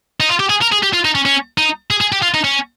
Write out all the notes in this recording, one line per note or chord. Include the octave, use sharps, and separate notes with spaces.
D#4
F4
G4
G#4
A#4
G#4
G4
F4
D#4
C#4
C#4
D#4
G#4
G#4
G4
F4
D#4
C#4